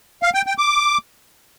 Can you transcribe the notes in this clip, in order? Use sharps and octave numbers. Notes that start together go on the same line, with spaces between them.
F5
G5
G5
D6